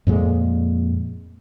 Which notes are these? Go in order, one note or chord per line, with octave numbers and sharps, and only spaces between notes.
F2 A#2 G#3